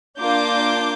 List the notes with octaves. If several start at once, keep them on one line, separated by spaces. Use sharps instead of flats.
A#3 D4 F4 D6 G6